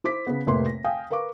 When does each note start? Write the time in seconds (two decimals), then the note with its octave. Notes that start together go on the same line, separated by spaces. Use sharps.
0.04 E4 C5 D6 B6
0.27 C#3 B3
0.46 F1 A2 C3 A#3 B4 C6
0.66 A#6
0.84 F5 G5 G#5 D#6
1.11 A#4 B4 F5 C#6 D6